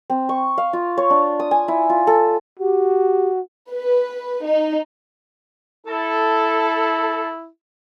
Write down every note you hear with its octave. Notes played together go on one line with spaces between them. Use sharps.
C4
C#6
F5
F4
C#5
D4
D#6
G#5
E4
F4
A4
F#4 G4
B4
D#4
E4 A4